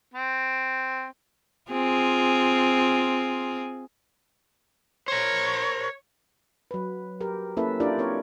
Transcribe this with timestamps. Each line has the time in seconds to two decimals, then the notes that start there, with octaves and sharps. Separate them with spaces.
0.14 C4
1.71 C4 F4 G#4
5.08 A#4 C5 C#5
6.71 F#3 B4
7.20 G4 A#4
7.57 A#3 C#4 E4 A4 B4 E5
7.80 D4 E4 F4 G4 A#4 D5
7.98 C4 A#4 C#5